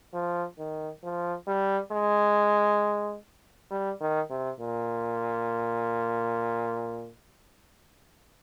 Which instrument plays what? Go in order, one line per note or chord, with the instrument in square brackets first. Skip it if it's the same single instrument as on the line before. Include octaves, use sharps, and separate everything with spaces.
[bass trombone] F3
D#3
F3
G3
G#3
G3
D#3
C3
A#2